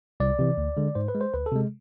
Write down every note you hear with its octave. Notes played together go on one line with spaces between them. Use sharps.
C2 D5
C3 E3
D2
D3 G#3
G#2 C5
B4
G#3
C5
D2 B4
A4
C3 G#3